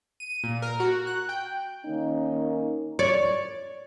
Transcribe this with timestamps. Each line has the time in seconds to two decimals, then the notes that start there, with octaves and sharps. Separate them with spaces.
0.20 D#7
0.44 A#2
0.62 A#4
0.80 F#4
1.07 F#6
1.29 G5
1.86 D#3 A#3 C#4 D#4
2.99 C#5 D5